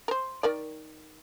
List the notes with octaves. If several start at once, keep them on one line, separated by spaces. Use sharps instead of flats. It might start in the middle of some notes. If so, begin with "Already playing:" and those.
A#4 C5
D#3 A#4 D5